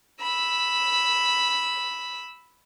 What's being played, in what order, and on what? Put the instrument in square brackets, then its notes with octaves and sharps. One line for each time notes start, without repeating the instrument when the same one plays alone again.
[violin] B5 E6